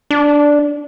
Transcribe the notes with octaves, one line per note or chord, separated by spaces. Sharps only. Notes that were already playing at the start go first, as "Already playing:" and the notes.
D4